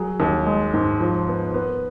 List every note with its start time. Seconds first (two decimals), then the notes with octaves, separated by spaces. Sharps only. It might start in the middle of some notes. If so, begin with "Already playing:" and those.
Already playing: F#3 G#4
0.20 D#2
0.47 G#3
0.74 G#2
1.00 F3
1.28 B3
1.54 B3